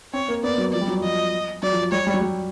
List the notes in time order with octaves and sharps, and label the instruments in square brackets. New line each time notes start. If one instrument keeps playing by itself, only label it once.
[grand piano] C4 [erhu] C#5
[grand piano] A#3
[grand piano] B3 [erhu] D5
[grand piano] F#3
[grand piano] F3 [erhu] D5
[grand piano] G3
F#3
[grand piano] F3 [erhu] D#5
[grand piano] F#3 [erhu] D5
[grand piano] F3
[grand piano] G3 [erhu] C#5
[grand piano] G3
F#3
G3